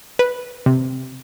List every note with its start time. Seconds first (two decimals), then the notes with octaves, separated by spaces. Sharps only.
0.19 B4
0.66 C3